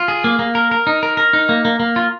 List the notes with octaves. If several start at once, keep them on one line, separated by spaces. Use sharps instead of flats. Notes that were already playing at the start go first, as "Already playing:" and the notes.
Already playing: F4
G#4
A#3
A#3
A#4
A#4
D#4
A#4
A#4
D#4
A#3
A#3
A#3
F4